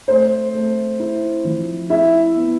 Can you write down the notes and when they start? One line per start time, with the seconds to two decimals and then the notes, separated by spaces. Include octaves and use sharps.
0.08 A3 C5
0.54 A3
1.00 E4
1.45 F3
1.90 E4 E5
2.35 B3